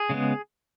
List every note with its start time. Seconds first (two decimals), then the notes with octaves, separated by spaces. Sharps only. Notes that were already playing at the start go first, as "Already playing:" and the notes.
Already playing: G#4
0.10 C#3 G#3 B3